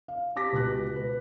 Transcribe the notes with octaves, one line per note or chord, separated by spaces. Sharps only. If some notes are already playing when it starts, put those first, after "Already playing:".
F5
G4 A5 D6 A#6 B6
C#2 B2 G4 F#6 A#6
B4